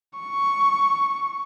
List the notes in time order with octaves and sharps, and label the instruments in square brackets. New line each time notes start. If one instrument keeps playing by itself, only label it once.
[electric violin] C#6